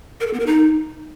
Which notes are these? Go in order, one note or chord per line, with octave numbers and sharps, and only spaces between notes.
A#4
A4
B3
A#4
D#4